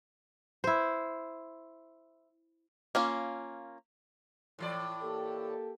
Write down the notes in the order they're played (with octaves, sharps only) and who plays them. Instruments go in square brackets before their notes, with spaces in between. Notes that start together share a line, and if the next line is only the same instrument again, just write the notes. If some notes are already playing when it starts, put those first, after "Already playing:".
[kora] E4 C5
[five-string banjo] A#3 C#4 F4
[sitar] A2 E3 D5
[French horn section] A#3 G4 A4